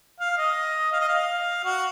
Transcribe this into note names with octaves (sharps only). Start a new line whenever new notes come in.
F5
D#5
F5
D#5
F5
F#4